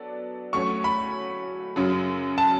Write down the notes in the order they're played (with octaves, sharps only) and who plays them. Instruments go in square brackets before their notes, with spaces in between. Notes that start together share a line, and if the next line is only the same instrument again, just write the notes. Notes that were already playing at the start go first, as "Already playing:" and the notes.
Already playing: [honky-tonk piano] F#3 B3 D4 A4 D5
[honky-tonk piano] F#3 A3 C#4 F#4 C#5 [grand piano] C#6
[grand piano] B5
[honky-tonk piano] F#2 C#3 F#3 C#4
[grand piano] A5